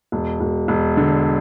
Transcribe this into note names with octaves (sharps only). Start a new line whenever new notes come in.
E1
E1
E1
D3